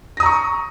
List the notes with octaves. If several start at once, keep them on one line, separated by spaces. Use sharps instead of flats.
A#5 C#6 D#6 A#6